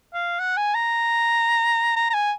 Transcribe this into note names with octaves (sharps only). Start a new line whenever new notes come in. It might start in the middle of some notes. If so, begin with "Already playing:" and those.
F5
F#5
G#5
A#5
A#5
A#5
G#5